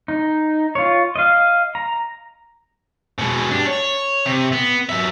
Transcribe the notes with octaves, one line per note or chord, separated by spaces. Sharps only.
D#4
F4 C#5
D#5 F5
A#5
B2 G#3
D4 G4
C#5
C3
B3
F#3 E5